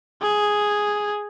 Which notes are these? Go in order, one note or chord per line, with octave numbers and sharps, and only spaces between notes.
G#4